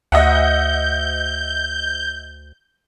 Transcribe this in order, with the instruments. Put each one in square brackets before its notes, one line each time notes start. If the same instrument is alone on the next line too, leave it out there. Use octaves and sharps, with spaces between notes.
[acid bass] D2 [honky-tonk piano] D#5 E5 F#5 [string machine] G6